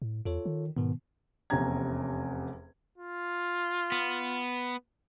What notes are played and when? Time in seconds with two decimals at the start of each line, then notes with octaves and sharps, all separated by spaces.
0.02 A2
0.25 E2 F4 A4 C#5
0.46 D#3
0.77 G#2 B2 D#3 B3
1.50 F1 E2 C3 C#4 A#5 G#6
2.98 F4
3.92 B3